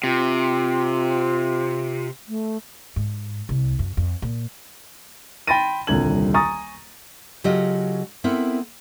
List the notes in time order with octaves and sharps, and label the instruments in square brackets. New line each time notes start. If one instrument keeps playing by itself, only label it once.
[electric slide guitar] C3 [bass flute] F4
[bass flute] A3
[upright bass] G#2
C2
F#2
F2
A#2
[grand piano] G5 B5 C6 A6 A#6 D#7
D#1 C2 D3 G#6 F#7
G#5 A#5 C#6 D#6 A6
[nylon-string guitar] C#3 F#3 F4 G4 A4 D#5
B3 C4 E4 A4 A#4